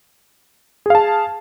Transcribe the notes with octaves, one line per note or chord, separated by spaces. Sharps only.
G#4 F5 A5